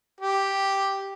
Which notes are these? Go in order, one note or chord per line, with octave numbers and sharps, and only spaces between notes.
G4